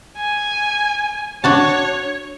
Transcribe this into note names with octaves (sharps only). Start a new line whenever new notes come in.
G#5
D4 F#4 C#5 A5